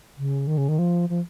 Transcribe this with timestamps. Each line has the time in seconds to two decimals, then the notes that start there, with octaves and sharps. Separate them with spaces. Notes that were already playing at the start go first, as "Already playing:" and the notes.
0.18 C#3
0.47 D#3
0.58 C#3
0.69 D#3
0.79 F3
1.09 F3